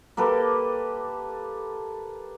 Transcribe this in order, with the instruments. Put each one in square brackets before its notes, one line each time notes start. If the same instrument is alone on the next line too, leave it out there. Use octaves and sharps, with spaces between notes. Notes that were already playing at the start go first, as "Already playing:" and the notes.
[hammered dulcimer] A#3 G4 A4 B4